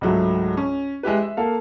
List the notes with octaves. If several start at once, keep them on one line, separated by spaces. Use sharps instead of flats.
C#2 G#2 F#3 A3
C#4
G#3 E4 G4 B4
E5
A#3 A4 F5